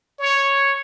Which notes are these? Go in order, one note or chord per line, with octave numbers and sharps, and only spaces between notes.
C#5